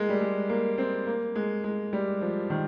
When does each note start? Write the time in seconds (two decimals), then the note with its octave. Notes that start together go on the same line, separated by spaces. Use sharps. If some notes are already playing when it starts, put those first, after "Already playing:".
Already playing: G#3 A#3
0.09 G3
0.21 G#3
0.49 A#3
0.78 C4
1.07 A#3
1.35 G#3
1.64 G#3
1.93 G3
2.22 F3
2.50 D#3